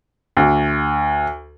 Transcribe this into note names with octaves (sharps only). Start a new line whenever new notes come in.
D2